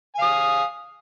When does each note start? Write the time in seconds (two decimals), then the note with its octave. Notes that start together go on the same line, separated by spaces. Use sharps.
0.15 G#5
0.19 F5
0.22 D#6